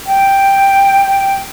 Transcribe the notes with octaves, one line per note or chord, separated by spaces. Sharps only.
G5